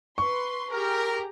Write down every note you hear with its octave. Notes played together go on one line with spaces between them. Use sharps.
B4 C6 C#6
G4 G#4 A#4 A#5